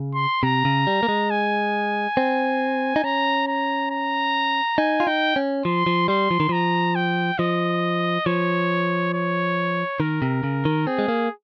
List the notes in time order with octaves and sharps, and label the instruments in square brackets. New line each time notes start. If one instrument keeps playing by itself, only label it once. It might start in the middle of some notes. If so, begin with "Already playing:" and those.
Already playing: [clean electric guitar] C#3
[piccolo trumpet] C6
[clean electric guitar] C3 [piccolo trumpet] A#5
[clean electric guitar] C#3
G3
A#3
G#3
[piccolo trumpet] G#5
[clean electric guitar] C4
D#4
[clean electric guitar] C#4 [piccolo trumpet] A#5
[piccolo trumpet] A#5
A#5
[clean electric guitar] D#4 [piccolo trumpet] G#5
[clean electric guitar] F4
[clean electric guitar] D#4 [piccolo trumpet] G5
[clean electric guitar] C#4
[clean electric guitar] F3 [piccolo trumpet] C6
[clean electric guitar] F3
[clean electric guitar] G3 [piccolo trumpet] C6
[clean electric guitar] F3
D#3
[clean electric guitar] F3 [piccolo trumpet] A#5
[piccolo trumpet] G5
[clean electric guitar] F3 [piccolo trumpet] D#5
[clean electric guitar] F3 [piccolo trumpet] C#5
[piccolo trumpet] C#5
[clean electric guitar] D#3 [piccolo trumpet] A#4
[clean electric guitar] C3
C#3
D#3
[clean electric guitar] C4 [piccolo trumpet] G#4
[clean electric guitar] G#3
A#3